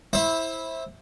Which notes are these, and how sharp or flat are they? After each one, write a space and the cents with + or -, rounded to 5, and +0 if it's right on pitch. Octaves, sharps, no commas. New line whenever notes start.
E4 -10 C5 +25